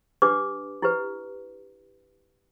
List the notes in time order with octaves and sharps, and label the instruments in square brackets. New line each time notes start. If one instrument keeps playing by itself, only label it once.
[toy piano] D4 G4 B4 D6
E4 G4 B4